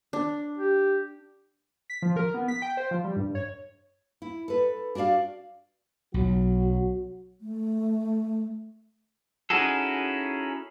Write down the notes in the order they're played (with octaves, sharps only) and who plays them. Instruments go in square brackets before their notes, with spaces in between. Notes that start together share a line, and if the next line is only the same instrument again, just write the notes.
[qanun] D4
[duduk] G4
[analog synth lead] B6
F3
A#4
B3
B6
G5
C5
F3
G3
G2
C#5
[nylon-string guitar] E4
A4 B4
D4 F#4 G4 D5 F5
[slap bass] B1 [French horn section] F#3 F#4
[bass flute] A3
[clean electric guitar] C#4 D#4 E4 F#4 G#4 A4